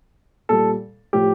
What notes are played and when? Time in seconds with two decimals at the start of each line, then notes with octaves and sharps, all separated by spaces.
0.49 A#2 G3 A4
1.13 A2 F3 G4